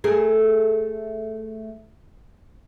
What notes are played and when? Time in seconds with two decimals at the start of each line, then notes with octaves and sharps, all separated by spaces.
0.04 A3 G#4 A#4